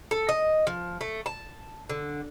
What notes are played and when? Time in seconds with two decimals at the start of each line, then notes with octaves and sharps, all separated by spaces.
0.11 A4
0.29 D#5
0.67 F3
1.01 A3
1.26 A5
1.89 D3